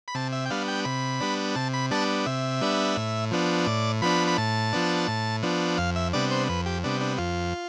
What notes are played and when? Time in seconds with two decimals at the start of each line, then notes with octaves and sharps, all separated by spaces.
0.08 B5
0.15 C3 A5
0.32 E5
0.46 G5
0.50 G3 B3 D4 F5
0.68 G5
0.85 C3 B5
1.21 G3 B3 D4
1.56 C3 A5
1.74 B5
1.91 G3 B3 D4 A5
2.26 C3 E5
2.61 G3 B3 D4
2.97 A2
3.31 F3 B3 D4
3.66 A2 D5
4.02 F3 B3 D4 B5
4.28 B5
4.38 A2 A5
4.73 F3 B3 D4
5.08 A2
5.43 F3 B3 D4
5.78 F2 F5
5.96 E5
6.13 C3 G3 B3 D4 D5
6.31 C5
6.49 F2 B4
6.66 G4
6.84 C3 G3 B3 D4
7.01 D4
7.18 F2 F4